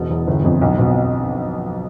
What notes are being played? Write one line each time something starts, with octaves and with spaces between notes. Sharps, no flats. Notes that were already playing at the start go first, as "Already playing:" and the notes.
Already playing: E1 B2
E2
G1
F2
B1
B2